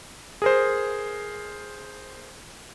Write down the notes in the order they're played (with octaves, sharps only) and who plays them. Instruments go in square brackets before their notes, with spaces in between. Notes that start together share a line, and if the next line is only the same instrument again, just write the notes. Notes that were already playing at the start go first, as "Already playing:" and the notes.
[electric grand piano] G#4 A#4 C5